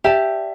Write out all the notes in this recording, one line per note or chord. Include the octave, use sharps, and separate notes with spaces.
G4 D5 E5 A5